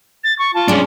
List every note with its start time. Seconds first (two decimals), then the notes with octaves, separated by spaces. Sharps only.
0.24 A6
0.39 C#6
0.54 F4 A5
0.68 G3 G#3 C#4 D4